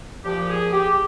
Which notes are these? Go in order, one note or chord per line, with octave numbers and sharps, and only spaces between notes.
A#2 F3 G4
G#4
G4